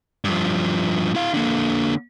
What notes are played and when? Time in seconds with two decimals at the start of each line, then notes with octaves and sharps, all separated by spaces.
0.25 G2 F3
1.15 E4 F5
1.34 D3 A#3